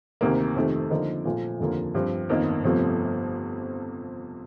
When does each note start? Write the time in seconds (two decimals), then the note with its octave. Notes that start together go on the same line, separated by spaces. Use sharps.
0.21 D2 C3 D#3 A#3
0.56 F2 C3 D#3 A3
0.90 D3 F3 A#3 D#4 A#4
1.25 A#1 A#2 F3 A3
1.60 F1 D#2 D3 F3 A#3
1.95 G2 F3 C4
2.29 G1 F2 D#3 A#3 D#4
2.64 G1 F2 C3 F3 A3